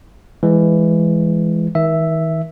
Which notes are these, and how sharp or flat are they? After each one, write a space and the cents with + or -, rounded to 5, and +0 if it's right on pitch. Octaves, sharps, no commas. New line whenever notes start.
E3 +15 G#3 +0
D#3 +45 E5 +0